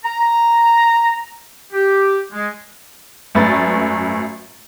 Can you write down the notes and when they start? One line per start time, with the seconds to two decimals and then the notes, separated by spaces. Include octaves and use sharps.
0.04 A#5
1.73 G4
2.32 G#3
3.35 G#1 F#2 A3 B4 A6